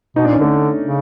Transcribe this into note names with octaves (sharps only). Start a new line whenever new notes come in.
B2 D#4
D4
A#2
C#4
D3 A3
C#3